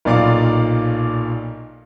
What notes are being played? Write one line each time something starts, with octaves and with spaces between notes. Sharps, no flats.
B1 A#2 D5 F5 D6